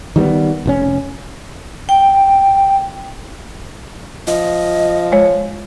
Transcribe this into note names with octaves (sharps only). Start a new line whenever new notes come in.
D#3 G3 A#3 B3
F1 A#2 C#4
G5
F3 D#5
G#3 C#5